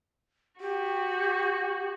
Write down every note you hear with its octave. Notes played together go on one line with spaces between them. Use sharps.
F#4 G4